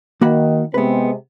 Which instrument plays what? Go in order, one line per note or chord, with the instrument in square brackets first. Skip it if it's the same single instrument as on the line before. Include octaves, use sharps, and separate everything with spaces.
[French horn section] D#3 [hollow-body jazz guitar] A#3 F#4 B5
[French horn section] C3 G#3 C4 [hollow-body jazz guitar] B3 B4